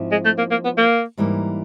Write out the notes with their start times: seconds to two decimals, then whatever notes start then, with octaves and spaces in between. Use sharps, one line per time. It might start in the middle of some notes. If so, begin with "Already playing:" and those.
Already playing: G#2 F3 C4 E4
0.11 G#3
0.25 A3
0.38 A#3
0.51 A#3
0.64 B3
0.77 A#3
1.17 G#2 E3 G3 A#3